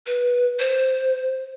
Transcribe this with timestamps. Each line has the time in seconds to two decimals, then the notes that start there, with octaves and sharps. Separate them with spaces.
0.06 B4
0.59 C5